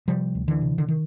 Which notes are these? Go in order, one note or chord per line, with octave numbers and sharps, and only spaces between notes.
C3 F3 G3
D2
D3 E3
C3
D3
D#3